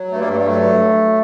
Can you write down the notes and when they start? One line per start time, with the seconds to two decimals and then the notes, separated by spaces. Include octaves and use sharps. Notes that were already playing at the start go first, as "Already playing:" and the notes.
Already playing: F#3
0.11 G2 A3
0.19 G3 A#3
0.28 G2 A3
0.37 G3
0.45 F#3 A3